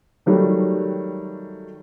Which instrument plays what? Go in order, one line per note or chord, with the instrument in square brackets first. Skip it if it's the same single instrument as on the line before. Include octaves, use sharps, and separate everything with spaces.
[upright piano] D#3 F#3 G3 A3